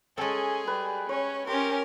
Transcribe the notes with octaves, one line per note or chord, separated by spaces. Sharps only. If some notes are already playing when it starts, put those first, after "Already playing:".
G#3 C#4 G#4 A4 A5
G3 B4
C#4 C#5
C#4 G4 A#4 C6